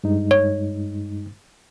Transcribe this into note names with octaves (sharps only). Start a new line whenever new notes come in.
G2 G#3 D#4
C#5